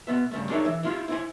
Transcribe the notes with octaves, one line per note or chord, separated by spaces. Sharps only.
B2 B3 E5
G2 C#3 A3
D4 D#4 G#4 A#4 C#5 E5
E3 E5
E4 F4 G4
E4 C5 G#5